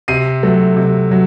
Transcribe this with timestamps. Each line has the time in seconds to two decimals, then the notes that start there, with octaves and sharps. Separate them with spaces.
0.08 C3 C7 D#7
0.43 F#3 A3
0.77 C3
1.11 F#3